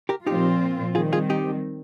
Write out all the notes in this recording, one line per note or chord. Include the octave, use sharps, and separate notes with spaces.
G4 A#4
A#2 F3 C4 D#4 F4 G4
D#3 G3 C4 F4 G#4
F4 G#4
D#4 G4